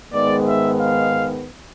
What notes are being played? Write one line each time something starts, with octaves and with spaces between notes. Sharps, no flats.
G#2 D#3 G#3 B3 D5
E5
F5